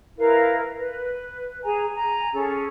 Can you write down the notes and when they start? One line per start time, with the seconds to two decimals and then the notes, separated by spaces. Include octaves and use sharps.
0.17 E4 A#4 B4 F5
0.78 B4
1.64 G#4 G#5 A#5
1.95 G#5 A#5
2.32 C#4 G#4 A4